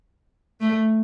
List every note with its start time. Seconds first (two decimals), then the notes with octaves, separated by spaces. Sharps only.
0.61 A3